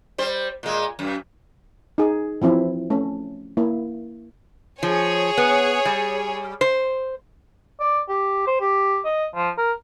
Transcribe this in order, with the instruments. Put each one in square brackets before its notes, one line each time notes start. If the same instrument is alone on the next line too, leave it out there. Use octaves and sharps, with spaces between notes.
[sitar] G3 C5
A#2 G#3
F#2
[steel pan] D#4 G#4
E3 F3 C4 E4
A3 C#4
A#3 E4
[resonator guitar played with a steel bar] F3 [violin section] G#4 C#5
[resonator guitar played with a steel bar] B3
G3
C5
[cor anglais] D5
G4
C5
G4
D#5
F3
A#4